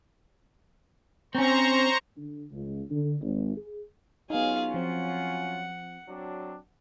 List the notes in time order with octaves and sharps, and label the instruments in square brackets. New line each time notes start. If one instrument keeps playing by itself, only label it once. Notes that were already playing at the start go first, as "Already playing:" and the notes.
[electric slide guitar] C4 C#4 [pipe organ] C5 A#5 C#6
[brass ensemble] D3
C#2
D3
G#1
G#4
[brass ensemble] F#3 C#4 F4 [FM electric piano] B3 D#4 [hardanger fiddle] G#4 F5
[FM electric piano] F3 C4 [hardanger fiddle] F#5
[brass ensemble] F#3 C4 D4